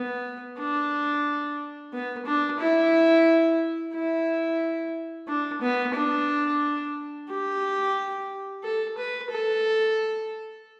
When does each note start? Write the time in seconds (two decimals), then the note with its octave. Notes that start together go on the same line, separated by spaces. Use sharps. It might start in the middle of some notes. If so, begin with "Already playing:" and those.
Already playing: B3
0.59 D4
1.93 B3
2.26 D4
2.60 E4
3.95 E4
5.28 D4
5.62 B3
5.95 D4
7.30 G4
8.63 A4
8.98 B4
9.30 A4